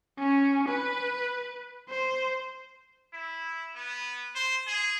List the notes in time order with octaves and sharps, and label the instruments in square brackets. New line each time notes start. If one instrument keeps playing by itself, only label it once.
[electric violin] C#4
B4
C5
[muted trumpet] E4
B3
C5
G#4